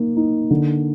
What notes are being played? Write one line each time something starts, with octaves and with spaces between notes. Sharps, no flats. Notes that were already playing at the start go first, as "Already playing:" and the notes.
Already playing: A#3 D#4
D#4
D3